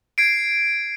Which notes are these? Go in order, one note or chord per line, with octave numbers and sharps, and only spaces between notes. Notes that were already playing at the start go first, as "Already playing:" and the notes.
G#6 C7 D7